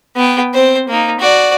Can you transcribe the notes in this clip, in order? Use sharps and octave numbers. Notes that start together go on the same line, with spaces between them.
B3 G5
C4 C5
A#3 D#4
F#4 D5